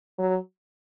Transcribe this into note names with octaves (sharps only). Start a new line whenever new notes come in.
F#3